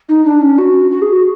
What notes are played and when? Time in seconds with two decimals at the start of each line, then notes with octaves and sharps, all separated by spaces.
0.09 D#4
0.25 D4
0.41 C#4
0.58 F#4
0.91 F#4
1.02 G#4
1.13 F#4